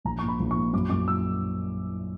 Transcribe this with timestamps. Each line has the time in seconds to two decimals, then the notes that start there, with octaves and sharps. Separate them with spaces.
0.05 A#1 A#5
0.19 A#2 C#6
0.28 B5
0.40 A#1
0.51 C#6
0.56 A#2
0.73 F#2 D6
0.90 F#2 D6
1.08 E6